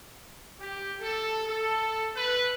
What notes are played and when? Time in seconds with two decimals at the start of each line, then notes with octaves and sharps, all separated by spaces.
0.60 G4
1.01 A4
1.47 A4
2.16 B4